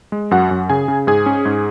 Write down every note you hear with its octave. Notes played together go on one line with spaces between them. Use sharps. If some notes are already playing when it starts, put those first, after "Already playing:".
G#3
F#2 F#4 F#5
F#2
C#3 G#4 G#5
C#3
G#2 G#4 G#5
C#4
G#2